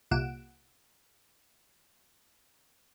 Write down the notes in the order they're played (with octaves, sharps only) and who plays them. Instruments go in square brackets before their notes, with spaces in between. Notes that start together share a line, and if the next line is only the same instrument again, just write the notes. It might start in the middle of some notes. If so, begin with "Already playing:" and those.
[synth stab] C2 A#2 F#5 D7 E7